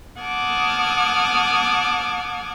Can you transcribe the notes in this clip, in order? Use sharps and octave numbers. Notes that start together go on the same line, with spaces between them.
F#5 A5 D6 D#6 F6 G#6